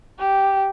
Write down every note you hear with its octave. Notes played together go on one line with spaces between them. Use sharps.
G4